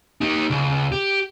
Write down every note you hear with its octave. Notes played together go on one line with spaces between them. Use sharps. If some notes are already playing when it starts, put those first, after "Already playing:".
D#4 G4
C#2
G4